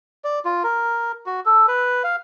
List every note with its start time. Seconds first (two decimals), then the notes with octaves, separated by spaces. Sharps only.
0.24 D5
0.45 F4
0.64 A#4
1.26 F#4
1.46 A4
1.68 B4
2.04 F5